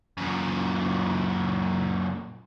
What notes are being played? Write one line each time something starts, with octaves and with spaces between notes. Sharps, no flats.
F#2 A#2